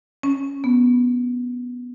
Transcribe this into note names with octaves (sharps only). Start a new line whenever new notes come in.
C#4
B3